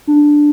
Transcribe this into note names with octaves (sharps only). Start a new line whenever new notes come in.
D4